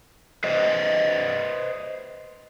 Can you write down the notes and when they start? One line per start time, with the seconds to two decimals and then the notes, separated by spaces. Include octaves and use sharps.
0.44 B4 C5 D#5